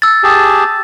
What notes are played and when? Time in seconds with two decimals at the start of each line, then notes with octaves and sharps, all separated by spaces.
0.02 E6 A6
0.24 G4 G#4 A5